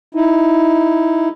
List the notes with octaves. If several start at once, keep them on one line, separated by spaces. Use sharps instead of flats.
D#4 E4